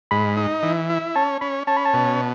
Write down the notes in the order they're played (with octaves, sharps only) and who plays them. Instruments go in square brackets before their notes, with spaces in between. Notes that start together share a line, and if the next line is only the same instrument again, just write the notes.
[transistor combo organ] G#2 [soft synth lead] B5
[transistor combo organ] D#4
E3
E4
[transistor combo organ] C#4 [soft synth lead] A5
[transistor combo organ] C#4 [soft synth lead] B5
[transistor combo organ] C#4 [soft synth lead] A5
[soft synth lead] B5
A5
[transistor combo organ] B2